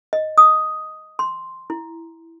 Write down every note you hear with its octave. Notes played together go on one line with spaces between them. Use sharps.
D#5
D#6
C6
E4